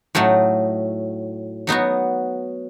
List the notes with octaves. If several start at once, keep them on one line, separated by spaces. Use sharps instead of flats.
A2 F#3 A3 D#4
F#3 B3 D#4 F#4